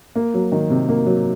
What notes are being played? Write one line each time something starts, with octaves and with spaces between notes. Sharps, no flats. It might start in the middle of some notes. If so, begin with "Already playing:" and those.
A#3
F#3
D#3
C3
A#3
F#3